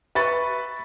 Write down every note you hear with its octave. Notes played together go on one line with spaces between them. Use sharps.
B4 E5 B5 C#6 A6